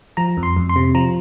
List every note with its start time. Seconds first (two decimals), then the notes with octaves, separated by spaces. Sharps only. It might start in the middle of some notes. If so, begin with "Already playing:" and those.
0.17 F3 A#5
0.37 F2
0.43 C6
0.56 F2
0.69 C6
0.76 C3
0.95 F3 A#5